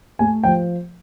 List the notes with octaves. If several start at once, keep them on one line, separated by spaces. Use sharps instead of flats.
A3 G#5
F3 G5